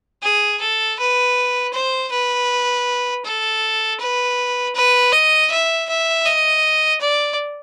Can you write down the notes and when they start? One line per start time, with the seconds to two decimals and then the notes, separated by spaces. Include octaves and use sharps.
0.22 G#4
0.61 A4
0.99 B4
1.73 C5
2.12 B4
3.25 A4
4.00 B4
4.75 B4
5.12 D#5
5.51 E5
5.89 E5
6.25 D#5
7.01 D5